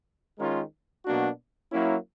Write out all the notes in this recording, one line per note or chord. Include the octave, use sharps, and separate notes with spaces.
D#3 G#3 C#4 F4 A#4
B2 F#3 A#3 D4 F#4
F#3 A#3 C#4 E4